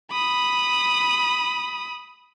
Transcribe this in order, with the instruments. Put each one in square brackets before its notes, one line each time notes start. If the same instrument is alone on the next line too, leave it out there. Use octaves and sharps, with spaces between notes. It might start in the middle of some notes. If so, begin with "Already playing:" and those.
[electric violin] B5 D#6